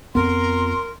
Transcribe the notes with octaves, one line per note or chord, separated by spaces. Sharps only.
F2 B3 A#4 C6